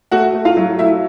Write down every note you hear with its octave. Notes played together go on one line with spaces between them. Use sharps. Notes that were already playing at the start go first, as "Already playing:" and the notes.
A3 F#4 F#5
A3
F4 F5
F#3
A3 E4 E5